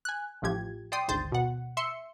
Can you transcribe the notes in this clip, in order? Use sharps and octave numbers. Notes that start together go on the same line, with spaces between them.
G#5 F#6
A1 A2 F3 G4 G#6
C5 D5 G5 D#6 C7
G#1 D2 C5 G6 A6
B2 F#5
E5 C6 C#7